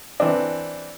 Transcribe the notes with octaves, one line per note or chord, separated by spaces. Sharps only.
E3 C4 D4